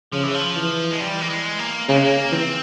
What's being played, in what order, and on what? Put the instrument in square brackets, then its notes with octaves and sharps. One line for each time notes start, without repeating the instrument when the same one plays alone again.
[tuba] C#3 [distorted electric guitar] F3
[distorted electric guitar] E3
F3
[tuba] E3
[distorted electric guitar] G#3
G3
A#3
G#3
A#3
[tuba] C#3 [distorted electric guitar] A#3
[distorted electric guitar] G#3
A#3
[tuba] E3 [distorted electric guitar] C4